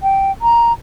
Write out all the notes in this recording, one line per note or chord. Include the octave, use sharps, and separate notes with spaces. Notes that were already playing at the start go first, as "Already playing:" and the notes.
G5
A#5